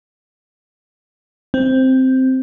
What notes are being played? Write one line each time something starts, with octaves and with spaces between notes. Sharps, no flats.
C4